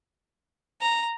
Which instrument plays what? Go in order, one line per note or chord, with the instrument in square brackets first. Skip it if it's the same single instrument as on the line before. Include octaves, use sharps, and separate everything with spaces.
[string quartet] A#5